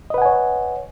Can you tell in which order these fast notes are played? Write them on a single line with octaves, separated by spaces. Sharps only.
D#5 B4 F#5 G#5 C#5